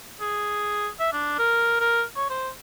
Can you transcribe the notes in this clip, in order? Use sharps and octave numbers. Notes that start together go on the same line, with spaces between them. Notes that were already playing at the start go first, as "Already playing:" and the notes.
G#4
E5
D4
A#4
A#4
C#5
C5